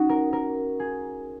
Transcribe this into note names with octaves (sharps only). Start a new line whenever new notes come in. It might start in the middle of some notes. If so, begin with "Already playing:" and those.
Already playing: C#4 D#4 F#4
A#4
A#4
G#4